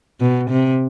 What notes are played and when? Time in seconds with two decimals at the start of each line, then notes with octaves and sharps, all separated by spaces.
0.21 B2
0.50 C3